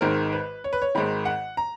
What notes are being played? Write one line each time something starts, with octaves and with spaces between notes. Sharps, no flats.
G#1 G#2 D#3 A#4
B4
C#5
B4
C#5
G#1 G#2 D#3 B5
F#5
A#5